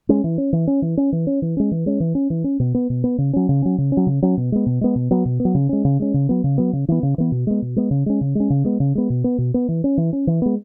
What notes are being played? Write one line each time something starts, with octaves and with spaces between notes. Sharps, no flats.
G#3 C#4
E3
C#4
E3
C#4
E3
C#4
E3
C#4
E3
G#3 C#4
E3
G#3 C#4
E3
C#4
E3
C#4
B2
B3
B2
B3
C#3
F#3 C#4
C#3
F#3 C#4
C#3
C#4
F#3
C#3
F#3 C#4
B2
G#3 B3
B2
G#3 B3
B2
F#3 B3
B2
B3
F#3
C#3
G#3 C#4
C#3
G#3 C#4
C#3
F#3 B3
C#3
F#3 B3
C#3
E3 B3
C#3
E3 B3
B2
G#3 B3
B2
G#3 B3
C#3
G#3 C#4
C#3
G#3 C#4
C#3
G#3 B3
C#3
G#3 B3
B2
B3
B2
B3
E3
C#4
E3
C#4
E3
G#3 B3